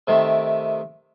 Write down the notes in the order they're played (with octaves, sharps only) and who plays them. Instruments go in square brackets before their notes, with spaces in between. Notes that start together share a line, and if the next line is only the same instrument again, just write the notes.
[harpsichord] C3 D#3 A3